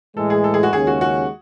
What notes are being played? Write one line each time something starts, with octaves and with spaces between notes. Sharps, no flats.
A2 E3 G#3 A4
G#4
A4
G#4
F#4
D#2 C#3 G#3 C#4 G#4
F#4
F#4